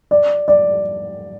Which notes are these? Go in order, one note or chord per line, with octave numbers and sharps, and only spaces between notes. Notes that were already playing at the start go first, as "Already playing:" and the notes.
D5
D5